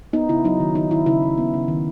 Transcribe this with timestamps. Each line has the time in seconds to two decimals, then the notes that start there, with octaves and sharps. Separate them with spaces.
0.13 B3 D#4
0.29 C#3 E4
0.44 F#3 D#4
0.60 D#3
0.75 D#3 D#4
0.91 D#3 E4
1.06 C#3 E4
1.23 C#3
1.38 B3
1.54 C#3
1.68 D#3